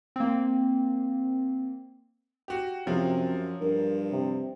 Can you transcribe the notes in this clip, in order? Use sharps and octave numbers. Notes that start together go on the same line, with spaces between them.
A#3 C4
F#4 G4
F#2 C3 F3 F#3
G2 A#4
C3